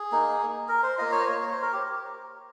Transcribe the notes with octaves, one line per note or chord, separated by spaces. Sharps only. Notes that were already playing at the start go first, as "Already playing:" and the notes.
Already playing: G#4
A#3 D#4
A#4
C5
A#3 F4 D#5
C#5
C5
C#5
C#5
C5
A#4
G4